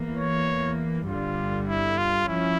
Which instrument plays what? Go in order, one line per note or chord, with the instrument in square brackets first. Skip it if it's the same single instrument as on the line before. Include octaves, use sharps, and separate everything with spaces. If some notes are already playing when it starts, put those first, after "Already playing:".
Already playing: [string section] E2 E3 A#3
[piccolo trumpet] C#5
[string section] G1 G2 D3 G3 [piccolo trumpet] F4
[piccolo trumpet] E4
F4
[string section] F3 C#4 [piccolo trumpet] E4